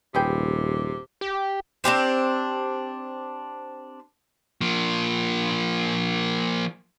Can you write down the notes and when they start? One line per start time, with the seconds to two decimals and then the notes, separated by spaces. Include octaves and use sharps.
0.15 D#1 C3 G#4 B4 G5
1.21 G4
1.84 C4 D4 G4 C5
4.61 F3 A#3